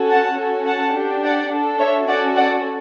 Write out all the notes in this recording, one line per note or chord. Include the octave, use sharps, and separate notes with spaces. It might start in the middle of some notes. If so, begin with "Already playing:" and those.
Already playing: C#4 F#4 A4
F#5 A5
C#4 F#4 A4
F#5 A5
D4 G4
D5 F#5
D4 A4
C#5 E5
C#4 F#4 A4 D5 F#5
D5 F#5